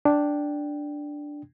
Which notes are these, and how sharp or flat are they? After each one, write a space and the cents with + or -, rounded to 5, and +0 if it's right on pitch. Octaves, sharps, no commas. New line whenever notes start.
D4 +0 G5 +0